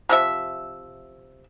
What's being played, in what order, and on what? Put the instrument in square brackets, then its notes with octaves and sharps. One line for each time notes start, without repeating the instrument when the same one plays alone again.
[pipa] C3 F3 E5